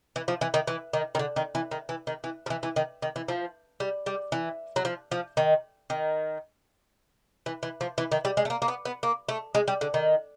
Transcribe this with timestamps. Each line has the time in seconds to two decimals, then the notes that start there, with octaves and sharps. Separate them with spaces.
0.16 E3
0.28 F3
0.41 E3
0.54 D#3
0.67 E3
0.93 D#3
1.15 D#3
1.19 D3
1.36 D#3
1.55 E3
1.71 D#3
1.89 E3
2.07 D#3
2.24 E3
2.46 F3
2.50 E3
2.63 E3
2.76 D#3
3.02 D#3
3.16 E3
3.28 F3
3.80 G3
4.06 G3
4.32 E3
4.76 F#3
4.85 F3
5.11 F3
5.37 D#3
5.90 D#3
7.46 E3
7.63 E3
7.81 F3
7.98 E3
8.12 D#3
8.25 G3
8.37 G#3
8.45 A3
8.50 A#3
8.62 A#3
8.68 B3
8.85 B3
9.03 A#3
9.29 A3
9.55 G#3
9.68 G3
9.81 D3
9.94 D#3